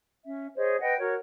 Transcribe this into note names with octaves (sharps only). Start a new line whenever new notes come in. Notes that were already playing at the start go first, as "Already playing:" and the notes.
C#4 E5
G#4 C5 C#5 D#5
B4 D#5 F#5 G5
F#4 A#4 C#5